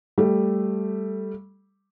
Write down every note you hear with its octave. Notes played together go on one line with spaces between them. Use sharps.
G3 A3